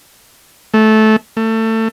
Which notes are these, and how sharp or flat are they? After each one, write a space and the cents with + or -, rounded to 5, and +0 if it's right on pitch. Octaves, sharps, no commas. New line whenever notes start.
A3 -15
A3 +25